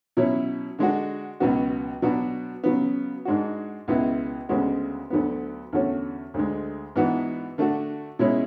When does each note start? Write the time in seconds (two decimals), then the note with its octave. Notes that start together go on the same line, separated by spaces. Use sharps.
0.17 B2 F#3 C#4 E4
0.79 D3 G#3 D4 F#4
1.40 C#2 B2 F#3 B3 F#4
2.02 B2 F#3 B3 D4 F#4
2.64 C#3 F#3 B3
3.25 G#2 G#3 D4 F#4
3.88 C#2 B2 G#3 B3 E4
4.49 D2 C#3 G#3 B3 F#4
5.10 D2 D3 F#3 B3
5.73 E2 D3 A3 C#4 F#4
6.34 D2 D3 G#3
6.96 G#2 E3 B3 D4 F#4
7.58 D3 A3 D4 F#4
8.19 B2 G#3 C#4 E4